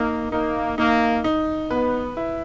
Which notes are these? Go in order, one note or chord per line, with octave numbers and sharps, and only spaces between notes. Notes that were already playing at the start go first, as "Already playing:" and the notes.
Already playing: A#3 D#4
A#3 D#4
A#3 D#4
D#4
B3 B4
E4